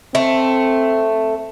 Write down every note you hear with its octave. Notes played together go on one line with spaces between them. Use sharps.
A3 C4